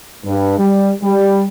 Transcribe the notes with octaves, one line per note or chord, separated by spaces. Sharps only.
G2
G3
G3